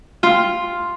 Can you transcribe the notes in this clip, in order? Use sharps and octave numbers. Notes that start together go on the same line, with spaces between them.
F4